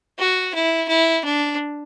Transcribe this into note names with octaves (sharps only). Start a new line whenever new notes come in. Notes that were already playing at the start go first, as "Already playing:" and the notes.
F#4
E4
E4
D4